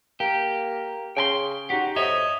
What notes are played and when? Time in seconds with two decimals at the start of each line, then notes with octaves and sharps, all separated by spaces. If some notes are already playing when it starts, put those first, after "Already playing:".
0.20 A#3 G4
1.17 C#3 G5 G#5 C6
1.70 D#4 F#4 G4
1.96 F2 C#5 D#5 E5 D#6